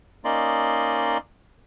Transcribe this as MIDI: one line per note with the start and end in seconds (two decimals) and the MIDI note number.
0.25 1.18 58
0.25 1.18 61
0.25 1.18 63
0.25 1.18 74
0.25 1.18 75
0.25 1.18 84